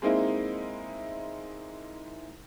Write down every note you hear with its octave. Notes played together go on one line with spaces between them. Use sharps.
G#3 A#3 C4 D#4 E4